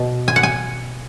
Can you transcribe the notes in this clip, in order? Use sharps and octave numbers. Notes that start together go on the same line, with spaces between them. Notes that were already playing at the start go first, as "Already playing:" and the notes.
Already playing: B2
G#5
F#5
G#5